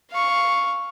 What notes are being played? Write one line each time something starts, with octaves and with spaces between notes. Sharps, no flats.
F5 C#6